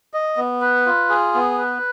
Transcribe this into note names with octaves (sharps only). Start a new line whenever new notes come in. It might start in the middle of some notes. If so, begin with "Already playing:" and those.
D#5
B3
B4
F4
G#4
B3
B4